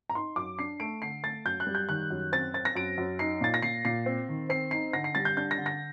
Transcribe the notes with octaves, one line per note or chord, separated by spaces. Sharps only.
A#5
D#4 C6
F#2 D6
D4 C7
A3 D7
D3 C7
A3 A6
F#2 G6
F#6
G3
G6
D#3 F#6
F#2
C4 A6
C4 A6
A#6
F#2 D7
F#2
D#4 C7
A#2 A6
A#6
A#2 C7
A#2 C7
C4
D#3
C4 C7
D#4 C7
D3 A#6
C7
G3 A6
G6
D4 G6
A#6
D3
A#6